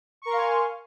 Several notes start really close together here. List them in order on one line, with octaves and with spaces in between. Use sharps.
C#6 A#4 C6 F5 G#5